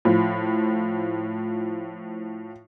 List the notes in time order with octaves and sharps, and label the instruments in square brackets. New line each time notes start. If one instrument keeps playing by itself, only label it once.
[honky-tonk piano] A2 F3